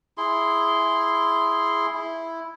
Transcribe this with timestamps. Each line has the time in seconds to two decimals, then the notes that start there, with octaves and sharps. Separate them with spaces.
0.18 E4 G#4 C6
1.94 E4